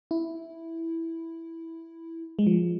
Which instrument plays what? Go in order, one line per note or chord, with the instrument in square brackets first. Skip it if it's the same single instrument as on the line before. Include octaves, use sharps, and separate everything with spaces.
[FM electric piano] E4
G#3
F3